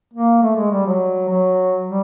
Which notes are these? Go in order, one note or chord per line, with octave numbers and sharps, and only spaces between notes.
A#3
A3
G#3
G3
F#3
F#3
G3